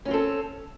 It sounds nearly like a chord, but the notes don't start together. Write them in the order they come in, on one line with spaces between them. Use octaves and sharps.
C#4 F#4 C4 A4